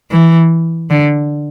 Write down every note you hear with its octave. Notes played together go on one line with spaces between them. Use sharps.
E3
D3